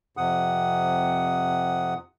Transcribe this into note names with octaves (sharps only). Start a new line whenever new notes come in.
F2 C3 F#5 D#6